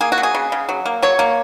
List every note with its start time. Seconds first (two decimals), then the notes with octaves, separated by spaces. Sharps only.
0.01 A#3 G#4
0.12 F#4
0.18 F#3
0.23 G#4
0.35 C#3
0.52 C#3
0.69 F#3
0.86 A#3
1.02 F#3 C#5
1.19 A#3